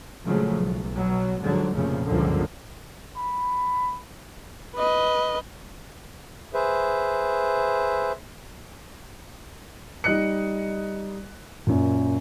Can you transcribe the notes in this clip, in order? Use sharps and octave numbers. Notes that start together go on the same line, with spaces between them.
A#2 C#3 F3 F#3 G#3 A3
B1
B2 F#3
G#2 D3 F3 F#3
F1 A#2 C#3 F3 A3
G1 C#2 F#2 D3 F3 A#3
B5
B4 D#5
G#4 B4 C5 E5
G3 D#4 D#5 F#6 C#7
F#2 A#2